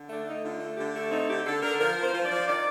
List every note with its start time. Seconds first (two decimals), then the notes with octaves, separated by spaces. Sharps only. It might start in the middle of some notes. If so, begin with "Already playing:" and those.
Already playing: D3
0.10 A3 D4
0.26 A3 D#4
0.43 D3 F4
0.60 A3
0.77 D3 G4
0.94 A3
1.11 C4 D#4
1.28 D3 G4
1.45 D3 A4
1.62 D3 A#4
1.79 F3 A#4
1.96 F3
2.02 C5
2.13 F3
2.25 D5
2.30 F3
2.47 D#3 D5